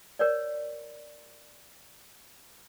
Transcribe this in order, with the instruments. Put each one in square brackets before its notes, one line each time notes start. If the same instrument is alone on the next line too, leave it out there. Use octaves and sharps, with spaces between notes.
[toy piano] A#4 C#5 D5